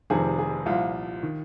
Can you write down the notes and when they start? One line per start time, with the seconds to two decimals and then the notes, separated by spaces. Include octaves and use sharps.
0.10 F1 F2 C3 D#3 G#4
0.38 G#4
0.66 C2 A#2 F3 F4
1.23 D#3